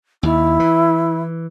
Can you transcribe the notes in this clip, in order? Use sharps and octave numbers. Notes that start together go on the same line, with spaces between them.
D#2 E4
E3